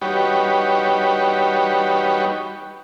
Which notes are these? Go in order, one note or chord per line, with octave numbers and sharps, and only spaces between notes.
G3 D#4 F#4 G4 B4 C#5